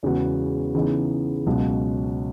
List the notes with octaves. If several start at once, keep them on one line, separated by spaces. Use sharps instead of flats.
E2 C#3 G#3 B3 F#4
C#3 E3 B3 D#4 G#4
C#2 B2 F#3 C#4 F#4